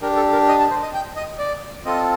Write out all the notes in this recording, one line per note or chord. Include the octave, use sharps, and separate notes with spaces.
D4 G4 A#4
A4
A#4
D#5
A5
C5
D#5
G5
D#5
D5
C4 F4 A4 D#5